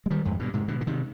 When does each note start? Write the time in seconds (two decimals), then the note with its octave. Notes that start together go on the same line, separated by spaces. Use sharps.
0.06 G#3
0.10 D#3 G3
0.25 F2 G#2
0.39 G2 B2
0.54 G#2 C3
0.68 B2 D3
0.81 D3
0.87 C3 D#3